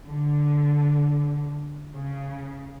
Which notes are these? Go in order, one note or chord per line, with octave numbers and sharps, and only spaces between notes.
D3
C#3